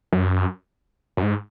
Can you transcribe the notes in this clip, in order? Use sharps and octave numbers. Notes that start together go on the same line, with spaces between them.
F#2
F#2
G#2